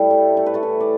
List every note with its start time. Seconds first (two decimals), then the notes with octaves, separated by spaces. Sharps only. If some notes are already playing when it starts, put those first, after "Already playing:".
Already playing: A2 G3 E4 G4 A4
0.10 A3
0.37 A3 A4
0.46 B4
0.54 A3 A4
0.63 E3
0.80 D5